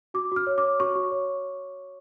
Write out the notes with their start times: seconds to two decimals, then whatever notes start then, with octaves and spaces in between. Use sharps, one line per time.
0.14 F#4 D6
0.32 F#4 F6
0.47 C#5
0.58 D6
0.63 C#5
0.80 F#4 C#6
0.95 F#4
1.12 C#5